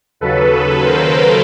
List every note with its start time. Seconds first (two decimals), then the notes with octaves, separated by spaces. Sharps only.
0.21 D#2 C#3 F#3 A4 B4
0.85 A#4 C5